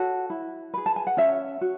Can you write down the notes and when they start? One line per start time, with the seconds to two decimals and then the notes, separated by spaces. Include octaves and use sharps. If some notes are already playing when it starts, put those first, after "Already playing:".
Already playing: F#4 A4 C#5
0.30 E4
0.74 G#4 B4
0.86 A5
0.96 G#5
1.07 F#5
1.17 C#4 C#5 E5
1.61 F#4